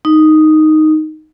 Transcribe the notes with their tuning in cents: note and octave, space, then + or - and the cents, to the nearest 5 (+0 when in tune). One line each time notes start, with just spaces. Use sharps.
D#4 +0